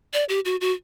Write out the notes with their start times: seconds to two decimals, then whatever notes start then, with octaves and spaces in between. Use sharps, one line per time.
0.13 D5
0.29 G4
0.45 F#4
0.61 F#4